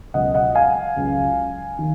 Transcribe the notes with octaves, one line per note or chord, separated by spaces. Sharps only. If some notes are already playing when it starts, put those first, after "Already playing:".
C#2 B2 F#3 D#5 F#5
D#5 F#5
F5 G#5
C#2 C#3 F#3
D#3